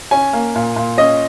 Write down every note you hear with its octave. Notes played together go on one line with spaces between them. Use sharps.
C#4 G#5
A#3
A#2
A#2
C#4 D#5